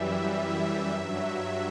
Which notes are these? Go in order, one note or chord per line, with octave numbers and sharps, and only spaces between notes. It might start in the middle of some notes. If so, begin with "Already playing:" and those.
Already playing: F#2 E3 G3 E5
E5
G2 F#3